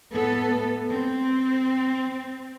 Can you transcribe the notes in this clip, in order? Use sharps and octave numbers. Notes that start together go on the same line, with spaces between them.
A2 B3 A4
C4